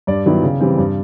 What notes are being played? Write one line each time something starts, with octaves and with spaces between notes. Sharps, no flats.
G2 D5
D#3 F#3 B3 E4
C#3
E3 G3 C4
G2